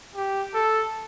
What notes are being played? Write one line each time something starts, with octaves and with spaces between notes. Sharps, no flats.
G4
A4